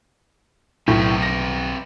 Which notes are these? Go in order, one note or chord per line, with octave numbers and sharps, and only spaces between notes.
B1 A2 C4 B4 E5
A#6